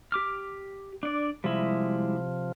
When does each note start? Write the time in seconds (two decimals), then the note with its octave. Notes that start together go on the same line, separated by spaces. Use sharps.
0.12 G4 D6 F6
1.03 D4 D5
1.44 C3 F3 G3 G#3 E4